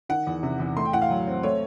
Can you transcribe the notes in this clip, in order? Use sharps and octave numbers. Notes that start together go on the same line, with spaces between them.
D#3 F#5
E2
C3
E2
A3 C6
G5
A2 F#5
F5
F#3
C4
A3 C#5